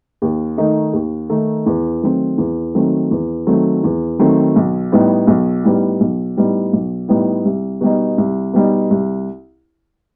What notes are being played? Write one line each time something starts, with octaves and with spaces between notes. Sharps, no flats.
D#2
D#3 A3 D#4
D#2
D#3 A3 D#4
E2
D#3 F#3 A3 C4
E2
D#3 F#3 A3 C4
E2
D#3 F#3 A3 C4
E2
D#3 F#3 A3 C4
B1
A2 G3 B3 D#4
B1
A2 G3 B3 D#4
B1
A2 G3 B3 D#4
B1
A2 G3 B3 D#4
C2
B2 G3 D#4
C2
B2 G3 D#4
C2